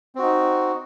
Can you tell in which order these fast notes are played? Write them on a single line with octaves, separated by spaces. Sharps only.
C4 F#4 D#4